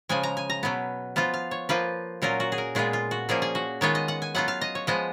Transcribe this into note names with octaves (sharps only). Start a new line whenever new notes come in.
C#3 F3 G#3 G#5
A#5
G#5
A#5
B2 F#3 B3
F3 B3 F4
F5
C#5
F3 A#3 F4 B4
A#2 F#3 C#4 F4 A#4
F#4
G#4
A#4
A#2 G#3 B3 F4 G#4
F4
F#4
A#2 F3 A#3 C#4 G#4
G#4
F#4
D#3 G#3 B3 F4 C#5
D#5
F#5
G#5
F#3 B3 F4 F#5
F5
D#5
C#5
F3 G#3 B3 D#5